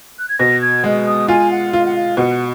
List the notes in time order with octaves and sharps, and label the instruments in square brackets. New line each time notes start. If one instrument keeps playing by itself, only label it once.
[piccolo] F#6
G#6
[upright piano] B2 [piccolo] A#6
[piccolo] G#6
[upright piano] G#3
[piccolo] D#6
[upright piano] F4 [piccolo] G#5
[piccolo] F#5
[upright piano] F4 [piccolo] F5
[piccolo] F#5
F5
[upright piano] B2 [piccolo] F#5